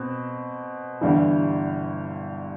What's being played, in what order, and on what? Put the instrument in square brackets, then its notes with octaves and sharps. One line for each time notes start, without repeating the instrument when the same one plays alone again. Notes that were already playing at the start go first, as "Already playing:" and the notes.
Already playing: [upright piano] B2 C4
G1 G2 E3